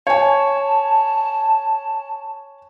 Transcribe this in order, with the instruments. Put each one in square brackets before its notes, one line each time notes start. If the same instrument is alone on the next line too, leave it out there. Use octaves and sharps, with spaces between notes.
[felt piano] C#5 G#5 [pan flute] A5